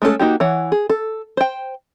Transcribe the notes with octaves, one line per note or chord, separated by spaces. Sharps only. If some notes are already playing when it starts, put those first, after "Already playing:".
G#3 A3 C#4 F#4 A4
A#3 D#4 F#4 G4
E3 C#5 F#5
G#4
A4
C5 G5